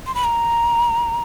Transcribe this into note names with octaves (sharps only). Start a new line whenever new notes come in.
C6
B5
A#5